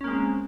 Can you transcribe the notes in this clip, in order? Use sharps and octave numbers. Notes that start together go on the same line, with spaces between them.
G#3 A#3 C4 C#4